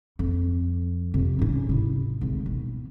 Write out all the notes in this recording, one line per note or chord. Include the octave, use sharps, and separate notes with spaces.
F2
F2 C3
G#2 C#4
C3 E4
G#1 D2
B2